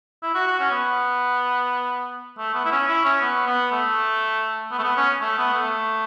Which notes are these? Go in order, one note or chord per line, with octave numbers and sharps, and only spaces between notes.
E4
F#4
F#4
C#4
B3
A3
B3
E4
C#4
E4
C#4
B3
B3
A3
B3
A3
B3
C#4
A3
B3
A3